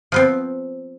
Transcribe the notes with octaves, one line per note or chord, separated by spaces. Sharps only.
F3 B3 C4